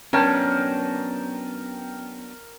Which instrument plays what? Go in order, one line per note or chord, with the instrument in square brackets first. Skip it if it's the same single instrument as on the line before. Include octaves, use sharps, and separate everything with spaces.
[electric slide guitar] F#3 B3 D4 [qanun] C#4 [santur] A#4 G5 A5